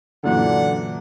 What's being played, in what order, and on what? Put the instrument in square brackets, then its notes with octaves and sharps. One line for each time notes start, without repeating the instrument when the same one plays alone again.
[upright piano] F#2 A#2 E3 [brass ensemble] D3 D4 F#5